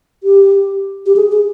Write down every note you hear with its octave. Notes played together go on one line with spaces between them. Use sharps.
G4
G4
G#4
G#4